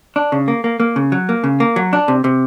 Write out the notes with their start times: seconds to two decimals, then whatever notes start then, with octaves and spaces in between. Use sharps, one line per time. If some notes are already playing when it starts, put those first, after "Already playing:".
0.16 D4
0.32 C#3
0.48 A#3
0.64 A#3
0.80 A#3
0.96 C#3
1.12 F#3
1.29 A#3
1.44 C#3
1.60 A#3
1.76 F#3
1.93 D4
2.08 C3
2.24 C3